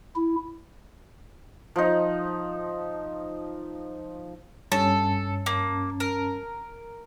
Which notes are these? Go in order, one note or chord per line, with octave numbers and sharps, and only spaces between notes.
E4
F3 D#4
G2 C#4 A4 A5
A#3
A#4